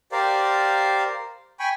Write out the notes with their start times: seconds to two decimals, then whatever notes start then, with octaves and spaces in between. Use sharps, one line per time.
0.12 G4 A#4 C5 D5 F5
1.60 G5 G#5 B5 C#6